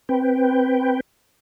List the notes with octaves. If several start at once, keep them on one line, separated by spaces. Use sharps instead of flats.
C4 B4 G5